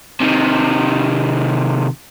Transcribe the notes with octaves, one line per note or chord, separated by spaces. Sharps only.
C3 D#3